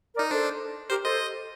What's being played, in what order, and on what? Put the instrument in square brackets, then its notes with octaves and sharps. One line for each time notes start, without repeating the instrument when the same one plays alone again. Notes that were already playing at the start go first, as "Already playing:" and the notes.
[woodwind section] A#4 D5
[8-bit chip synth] D#4
[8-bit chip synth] D4 [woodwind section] A4 C5
[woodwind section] G4 A#4 [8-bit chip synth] C5
[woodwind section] A4 C5 [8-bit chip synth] D#5